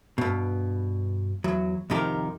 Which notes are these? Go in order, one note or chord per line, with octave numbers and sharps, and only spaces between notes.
G2 B2
E2 F#3
C2 F2 C3 D#3 G4 A#4